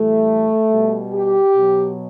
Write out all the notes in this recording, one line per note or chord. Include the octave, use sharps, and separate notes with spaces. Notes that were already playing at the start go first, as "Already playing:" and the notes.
Already playing: A2 E3 G3 A3
B2 G3
G4
B2 F#3